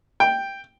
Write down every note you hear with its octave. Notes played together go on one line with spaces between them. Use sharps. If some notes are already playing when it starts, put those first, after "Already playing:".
G5